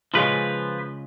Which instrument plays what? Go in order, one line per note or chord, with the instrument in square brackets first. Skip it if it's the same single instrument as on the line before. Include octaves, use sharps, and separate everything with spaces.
[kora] C#3 G#3 F4 [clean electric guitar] F3 B4